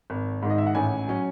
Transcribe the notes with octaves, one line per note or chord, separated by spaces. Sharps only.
G#1
G#2 D#3
D#5
E5
F#5
A1 G#5
F#3 C#4